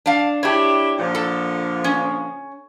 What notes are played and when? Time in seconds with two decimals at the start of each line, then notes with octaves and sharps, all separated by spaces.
0.06 D4 F5
0.43 D4 E4 G4 C#5
0.99 A#2 D3 F3
1.15 A4
1.84 C#4